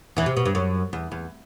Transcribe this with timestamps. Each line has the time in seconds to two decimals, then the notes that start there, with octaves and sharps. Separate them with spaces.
0.17 E2 E3
0.26 C3
0.37 B2
0.46 G2
0.55 F#2
0.93 E2
1.12 E2